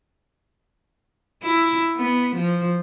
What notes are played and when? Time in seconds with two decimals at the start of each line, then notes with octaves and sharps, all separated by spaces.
1.43 E4
1.96 B3
2.35 F3